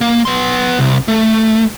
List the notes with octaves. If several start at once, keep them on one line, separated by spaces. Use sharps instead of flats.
A#3
B3 C6
C2
A3